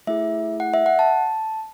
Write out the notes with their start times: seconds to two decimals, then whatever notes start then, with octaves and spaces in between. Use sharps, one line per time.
0.07 A3 E4 G#4 E5
0.60 F#5
0.74 E5
0.86 F#5
0.99 A5